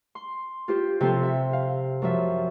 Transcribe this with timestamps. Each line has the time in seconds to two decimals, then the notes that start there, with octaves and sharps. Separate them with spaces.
0.15 C6
0.68 F4 G4 C5
1.01 C3 F3 C4 A4 C5
1.23 E5
1.53 F5
2.02 F#2 F3 E5